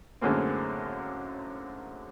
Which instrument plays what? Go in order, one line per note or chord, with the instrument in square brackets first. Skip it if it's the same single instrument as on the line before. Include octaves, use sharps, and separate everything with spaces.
[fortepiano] F#2 A2 D3 G#3 A#3 C4